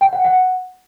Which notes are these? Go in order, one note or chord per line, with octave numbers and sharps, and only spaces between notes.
G5
F#5
F#5